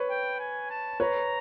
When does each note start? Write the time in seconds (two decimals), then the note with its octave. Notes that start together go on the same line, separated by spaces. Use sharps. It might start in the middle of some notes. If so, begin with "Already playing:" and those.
Already playing: B4 C#5
0.10 G5
0.39 G#5
0.70 A5
1.00 B4 C#5 A#5